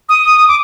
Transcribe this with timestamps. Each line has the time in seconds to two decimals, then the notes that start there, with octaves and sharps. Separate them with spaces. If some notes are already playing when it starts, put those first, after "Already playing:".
0.09 D#6
0.48 D6